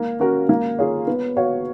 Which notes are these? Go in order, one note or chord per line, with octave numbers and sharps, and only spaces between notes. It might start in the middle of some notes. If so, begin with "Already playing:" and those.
Already playing: A#3
C#4 F#4 A#4
A#3
F4 G#4 C#5 F5
B3
F#4 C#5 F5